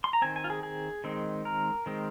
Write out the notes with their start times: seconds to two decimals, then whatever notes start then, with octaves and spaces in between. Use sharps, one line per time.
0.04 C6
0.13 A#5
0.22 D#3 C4 G#5
0.36 G#5
0.44 F4
0.50 G#4
0.63 G#4
1.04 D#3 G#3 C4
1.45 A#4
1.86 D#3 G#3 C4